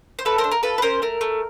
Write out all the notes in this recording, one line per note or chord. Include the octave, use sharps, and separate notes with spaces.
C5
A3 A4 B4
A#4 C5
D4
A#4
F4 A4 B4
B4
C#4 A#4 C5
A3 A#4
A3